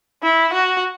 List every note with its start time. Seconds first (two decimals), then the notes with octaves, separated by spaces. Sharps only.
0.23 E4
0.53 F#4